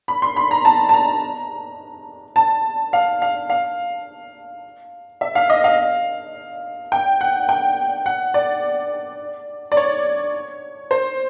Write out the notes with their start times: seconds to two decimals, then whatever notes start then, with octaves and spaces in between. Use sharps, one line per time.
0.08 B5
0.22 C6
0.36 B5
0.51 A#5
0.65 A5
0.89 A5
0.94 A#5
2.36 A5
2.93 F5
3.22 F5
3.50 F5
5.21 E5
5.35 F5
5.50 D#5
5.64 F5
6.92 G5
7.21 F#5
7.49 G5
8.06 F#5
8.34 D5
9.72 D5
9.77 C#5
10.91 C5